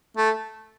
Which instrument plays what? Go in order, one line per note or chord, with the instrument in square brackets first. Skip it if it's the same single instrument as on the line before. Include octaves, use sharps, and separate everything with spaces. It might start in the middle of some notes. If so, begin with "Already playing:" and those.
[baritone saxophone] A3